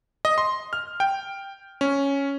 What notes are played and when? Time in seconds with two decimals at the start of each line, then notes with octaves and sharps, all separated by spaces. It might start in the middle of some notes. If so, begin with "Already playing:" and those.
0.25 D#5
0.38 C6
0.73 F6
1.00 G5
1.81 C#4